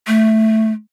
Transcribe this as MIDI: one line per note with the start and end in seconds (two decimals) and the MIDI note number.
0.07 0.72 57